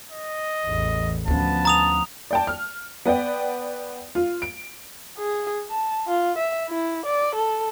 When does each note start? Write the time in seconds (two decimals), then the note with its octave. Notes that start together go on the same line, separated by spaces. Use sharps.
0.11 D#5
0.66 A1 E2
1.28 D2 F3 B3 C#4 A5
1.65 A#5 D#6 F7
2.31 D5 G5 A5
2.47 F6
3.06 B3 B4 D5 G5
4.15 F4
4.42 D7
5.18 G#4
5.69 A5
6.08 F4
6.38 E5
6.69 E4
7.06 D5
7.35 A4